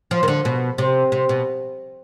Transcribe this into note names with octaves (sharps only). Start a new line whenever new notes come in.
F3
D#3
D3
B2
C3
C3
B2